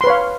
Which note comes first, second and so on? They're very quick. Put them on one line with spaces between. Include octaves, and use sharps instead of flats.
C6 B4 C#5 F5